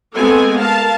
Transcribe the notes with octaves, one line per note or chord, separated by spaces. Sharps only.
G#3 A3 B3 C4 A4 G#5
A#4 F5 A5